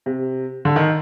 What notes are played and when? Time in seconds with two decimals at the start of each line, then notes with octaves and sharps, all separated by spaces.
0.06 C3
0.65 D3
0.76 D#3